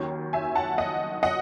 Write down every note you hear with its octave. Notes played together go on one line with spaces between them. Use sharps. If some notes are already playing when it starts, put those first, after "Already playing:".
Already playing: D#2 D#3 F#3 C#4
E5 G#5
F#5 A5
D#5 F#5
D#5 F#5